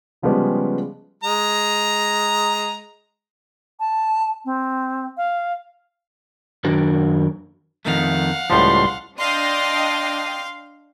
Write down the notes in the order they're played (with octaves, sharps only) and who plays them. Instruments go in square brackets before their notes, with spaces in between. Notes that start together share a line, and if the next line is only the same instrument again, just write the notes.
[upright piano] C#3 F3 G3 G#3 B3 C#4
[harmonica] G#3 A#5
[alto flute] A5
C4
F5
[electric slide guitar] F#2 D#3 D4 F#4 A#4
[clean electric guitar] F2 D#3 A3 [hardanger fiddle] F5 F#5
[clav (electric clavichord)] C#2 A2 F3 [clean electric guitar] G3 [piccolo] C6
[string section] D4 D#5 G5 [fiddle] F5 C6